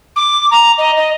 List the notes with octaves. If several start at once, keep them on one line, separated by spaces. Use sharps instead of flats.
D6
A#5
D#5
D#5